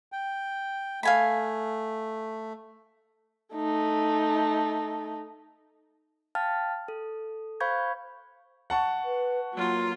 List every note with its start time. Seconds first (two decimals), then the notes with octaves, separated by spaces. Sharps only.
0.12 G5
1.03 A3 F5 G#5 B5
3.55 A3 D#4
6.35 F5 G5 A5 F6 A6
6.88 A4
7.61 C5 F5 B5 C#6 G6 G#6
8.70 F#5 A5 C#6
9.04 B4
9.54 F#3 A#3 F4